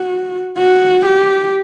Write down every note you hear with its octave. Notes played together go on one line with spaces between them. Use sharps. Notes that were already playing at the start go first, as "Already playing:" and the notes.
Already playing: F#4
F#4
G4